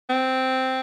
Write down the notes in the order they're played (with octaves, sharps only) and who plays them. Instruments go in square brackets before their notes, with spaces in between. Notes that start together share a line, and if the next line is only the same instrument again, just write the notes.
[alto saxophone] C4